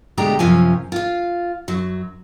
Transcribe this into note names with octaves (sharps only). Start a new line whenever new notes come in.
D2 B2 G#3 A3 G4 A#5
F#2 C3 F3 C#4 G#5
F4 F5
F#2 F#3